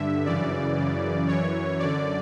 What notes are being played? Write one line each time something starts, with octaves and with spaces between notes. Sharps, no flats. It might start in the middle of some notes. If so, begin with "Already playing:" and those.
Already playing: G2 D3 E5
F#2 C#3 E3 D5
F#2 C#3 E3
F#2 E3 C#5
F#2 D3 D5